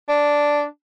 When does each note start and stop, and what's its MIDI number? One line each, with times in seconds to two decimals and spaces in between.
0.09 0.64 62